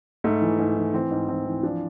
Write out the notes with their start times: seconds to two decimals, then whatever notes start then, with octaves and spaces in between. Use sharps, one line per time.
0.24 G#2 A3
0.42 E3
0.59 G#2
0.77 E3
0.93 E3 C4
1.11 G#2
1.29 E3 C4
1.46 E3
1.63 F3 D4